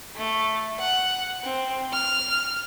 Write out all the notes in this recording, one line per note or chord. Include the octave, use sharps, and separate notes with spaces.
A3
F#5
C4
F6